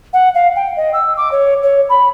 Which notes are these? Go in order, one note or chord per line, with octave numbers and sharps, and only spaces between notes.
F#5
F5
G5
D#5
E6
D6
C#5
C#5
B5